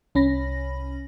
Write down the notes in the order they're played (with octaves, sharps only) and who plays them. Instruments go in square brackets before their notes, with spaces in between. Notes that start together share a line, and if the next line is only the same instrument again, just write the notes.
[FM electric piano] C2 C#4 B5 A#6